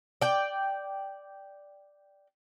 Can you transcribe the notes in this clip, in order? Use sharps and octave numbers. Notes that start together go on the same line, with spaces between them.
D5 G5